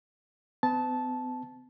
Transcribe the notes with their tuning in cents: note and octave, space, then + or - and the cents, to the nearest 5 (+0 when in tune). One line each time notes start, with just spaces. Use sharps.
B3 +45 A5 -10